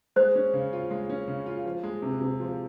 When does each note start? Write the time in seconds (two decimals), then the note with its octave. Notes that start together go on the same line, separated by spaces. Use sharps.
0.16 G#3 C5
0.36 C#4
0.54 C#3
0.73 F4
0.91 G#3
1.10 C#4
1.28 C#3
1.46 F4
1.65 F3
1.83 G#3
2.02 C3
2.21 C3
2.40 F3